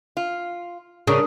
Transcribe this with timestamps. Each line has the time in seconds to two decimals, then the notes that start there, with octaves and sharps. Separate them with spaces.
0.17 F4
1.07 C#3 D4 G#4 A#4 D#6